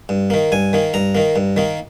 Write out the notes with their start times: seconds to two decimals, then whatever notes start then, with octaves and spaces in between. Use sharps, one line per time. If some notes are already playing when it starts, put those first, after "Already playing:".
0.09 G2
0.30 D#3 A#3
0.52 G2 G#5
0.73 D#3 A#3
0.94 G2 A#5
1.15 D#3 A#3
1.36 G2
1.57 D#3 A#3